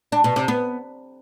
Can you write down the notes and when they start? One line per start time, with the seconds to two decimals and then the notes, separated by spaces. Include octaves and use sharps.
0.12 D4
0.24 B2
0.36 C3
0.48 B3